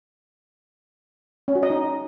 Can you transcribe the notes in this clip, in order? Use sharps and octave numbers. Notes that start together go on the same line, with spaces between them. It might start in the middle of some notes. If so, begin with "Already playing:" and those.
C#4
F#4
D#5
D#4